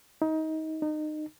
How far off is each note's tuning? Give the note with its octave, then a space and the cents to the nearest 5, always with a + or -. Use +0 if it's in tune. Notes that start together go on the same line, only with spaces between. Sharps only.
D#4 +25
D#4 -25